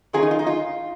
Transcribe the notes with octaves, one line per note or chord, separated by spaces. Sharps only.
D#3 F#3 A#3 C#4 F4 G#4
D#4
F4
D#4
F4